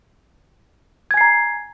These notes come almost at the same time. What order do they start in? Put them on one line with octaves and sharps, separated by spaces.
G#6 G#5 C7 A#5